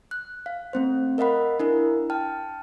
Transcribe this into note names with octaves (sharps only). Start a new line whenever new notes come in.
F#6
F5
A3 C4 C5
A#4 D#5 F5 F#5 B5
D4 E4 A#4
G5 A5 F6